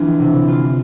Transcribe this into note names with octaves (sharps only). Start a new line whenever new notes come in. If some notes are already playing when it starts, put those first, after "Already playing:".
Already playing: D3 E3 F3 F4
C3
F4